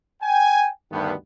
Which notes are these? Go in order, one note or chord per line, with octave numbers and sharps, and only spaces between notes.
G5 G#5
D2 G2 D#3 B3